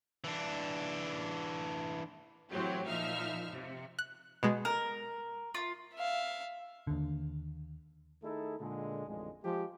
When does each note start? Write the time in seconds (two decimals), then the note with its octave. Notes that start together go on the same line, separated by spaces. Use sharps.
0.24 E3 D4
2.52 A2 E3 F#3 C4 G4
2.88 A#2 F3 D#4 E5 F5 F6
3.51 C3
3.99 F#6
4.43 B2 G#3
4.65 A#4
5.55 F4
5.95 E5 F5
6.87 D#2 D3
8.23 D#3 A3 D#4 E4 G#4 A4
8.59 A#2 D3 G#3
9.06 A1 F2 D3 G#3
9.43 F3 G#3 G4